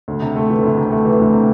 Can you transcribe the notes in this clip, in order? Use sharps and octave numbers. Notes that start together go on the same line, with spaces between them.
D2
C3
A3
E3
D2
C3
A3
E3
D2
C3